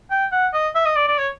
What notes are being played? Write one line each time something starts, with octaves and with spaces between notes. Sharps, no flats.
G5
F#5
D#5
E5
D#5
D5
D5
C#5